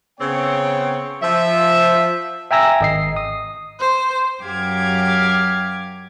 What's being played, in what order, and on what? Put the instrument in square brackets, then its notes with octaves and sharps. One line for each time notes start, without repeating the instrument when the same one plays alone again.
[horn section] C#3 B3 C4 C#5 G5
F3 E5
[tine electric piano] E5 G5 G#5 A#5 E6 A#6
G#1 D#5 C7
D#6
[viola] C5
[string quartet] F#2 G4 F5 D6 G#6